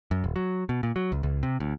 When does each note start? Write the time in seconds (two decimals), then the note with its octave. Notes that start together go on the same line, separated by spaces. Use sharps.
0.11 F#2
0.24 D#1
0.36 F#3
0.69 B2
0.83 A#2
0.96 F#3
1.12 C#2
1.23 C#2
1.43 C3
1.60 D2